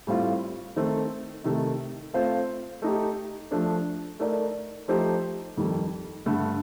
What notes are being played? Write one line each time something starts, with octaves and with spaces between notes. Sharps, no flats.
A2 G3 C4 F4
D#3 A3 C4
C3 D#3 A3
A3 C4 F4 C5
A3 D#4 G4
F3 A3 D4 A4
A3 D#4 A#4 D5
F3 A3 D#4 G4 C5
F2 D#3 G3
G2 D3 A3